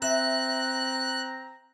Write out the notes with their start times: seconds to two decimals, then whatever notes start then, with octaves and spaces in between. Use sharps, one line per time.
0.02 C4 E5 A#5 F#6